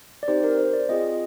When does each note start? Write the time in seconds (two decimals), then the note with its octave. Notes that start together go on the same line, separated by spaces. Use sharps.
0.23 D5
0.28 C4 D#4 G4 C5
0.44 A#4
0.58 C5
0.73 D5
0.89 C4 F4 G#4 D#5